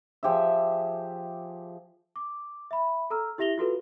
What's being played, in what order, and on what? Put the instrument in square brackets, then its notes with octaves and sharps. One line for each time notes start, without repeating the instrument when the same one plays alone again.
[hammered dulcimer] F3 G4 G#4 E5
[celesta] D6
E5 B5
A4 A#5 E6 F6
E4 G4 E5 A#6 F7 G7
F4 F#4 A4 B4